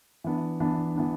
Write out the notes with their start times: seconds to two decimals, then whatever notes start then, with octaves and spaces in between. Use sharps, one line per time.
0.24 E3 B3 D4
0.60 E3 B3 D4
0.96 E3 B3 D4